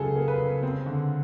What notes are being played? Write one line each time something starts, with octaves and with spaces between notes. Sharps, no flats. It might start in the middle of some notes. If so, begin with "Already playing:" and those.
Already playing: C#2 C#3 F#3 G#4 A4
A#3
B4
C#3
C4
D3